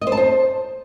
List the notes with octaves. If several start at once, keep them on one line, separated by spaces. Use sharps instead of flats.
D#5
C5
A5
C5